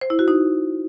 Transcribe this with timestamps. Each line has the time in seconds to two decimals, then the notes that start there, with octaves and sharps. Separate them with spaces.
0.01 C5
0.10 E4
0.19 F#4
0.28 D#4